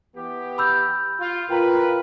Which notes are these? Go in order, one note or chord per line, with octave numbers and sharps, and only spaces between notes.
E3 B3 G4
B5 E6 G6
F4
A2 F4 A#4 B4 G5 A#5